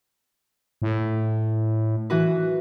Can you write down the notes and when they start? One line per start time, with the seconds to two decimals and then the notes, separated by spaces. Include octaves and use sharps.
0.82 A2
2.10 E3 F#4 B4